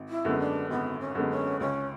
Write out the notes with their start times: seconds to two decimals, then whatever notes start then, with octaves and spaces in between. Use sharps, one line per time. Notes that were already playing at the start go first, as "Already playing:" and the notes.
Already playing: G#1
0.09 E4
0.25 F#2 D3 G#3 B3
0.40 D4
0.70 G#1 B3
1.00 C#4
1.15 F#2 D3 G#3 B3
1.30 C#4
1.60 C#2 C#4